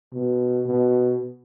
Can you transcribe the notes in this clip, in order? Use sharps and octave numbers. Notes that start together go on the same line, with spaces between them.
B2
B2